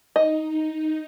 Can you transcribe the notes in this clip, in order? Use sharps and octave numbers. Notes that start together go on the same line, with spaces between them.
D#4 D#5